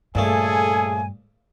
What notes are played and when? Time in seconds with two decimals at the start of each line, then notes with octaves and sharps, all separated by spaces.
0.15 A#1 G2 C#3 A3 G#4 A4 G#5